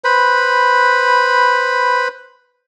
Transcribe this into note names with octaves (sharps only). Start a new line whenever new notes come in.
B4 C5 B5